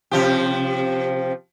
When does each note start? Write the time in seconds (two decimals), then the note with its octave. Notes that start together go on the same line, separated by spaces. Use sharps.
0.11 C3 F3 G4